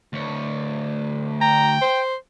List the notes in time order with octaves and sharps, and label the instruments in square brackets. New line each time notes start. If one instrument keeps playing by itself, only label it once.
[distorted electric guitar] D2 C#5
[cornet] G5 [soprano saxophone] A#5
[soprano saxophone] C5